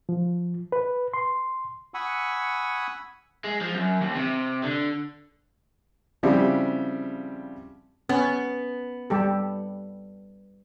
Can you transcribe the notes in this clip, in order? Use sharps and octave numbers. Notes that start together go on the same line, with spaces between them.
F3
B4
C6
F#5 G#5 B5 C#6 D#6 E6
G#3
F3
F#2
D#2
C3
D3
C#3 F3 G3 C4 E4 G4
B3 C#4
G3 G4 A4